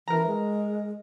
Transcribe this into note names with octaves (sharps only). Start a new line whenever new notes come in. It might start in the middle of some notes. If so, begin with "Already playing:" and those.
E3 A#4 A#5
G#3